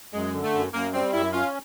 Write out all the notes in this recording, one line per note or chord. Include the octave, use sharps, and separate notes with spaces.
F#2 G#3
D3
A3
F#2
F#2 A#3
G3 C4
F#2 E4
C#4 F4